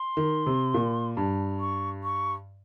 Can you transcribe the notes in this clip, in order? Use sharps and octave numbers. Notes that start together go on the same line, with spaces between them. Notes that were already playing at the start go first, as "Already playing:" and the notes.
Already playing: C6
D#3
C3
A#2
G2
C#6
C#6